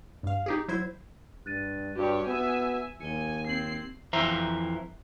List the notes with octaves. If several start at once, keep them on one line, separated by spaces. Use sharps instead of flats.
G2 F5
D#4 G4 G#4
F#3 E4 C5 G#6
G2 F#6 A6 D#7
G2 F#4 G4 C#5
B3 E5 G#5
D#2 G#5 C#7 G7
C4 G#6 C7 F#7
F2 E3 C5 E5 A#5